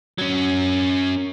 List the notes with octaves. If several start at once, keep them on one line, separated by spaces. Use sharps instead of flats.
F#3 C#4